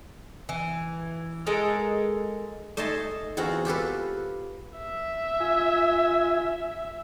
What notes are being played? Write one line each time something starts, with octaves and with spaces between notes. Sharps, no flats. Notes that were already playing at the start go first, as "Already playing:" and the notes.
E3
G#3 A4 A#4 D#5
A3 D#4 D#5 G#5 A5 C6
E2 C4 F4 F#4 A#5
F4 G4 A4 B4
E5
F4 G#5